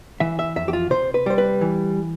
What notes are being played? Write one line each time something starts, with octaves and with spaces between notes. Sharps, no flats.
E3 E5
E5
F2 E5
G4
F4
C3 C5
B4
G3 C5
B4
E3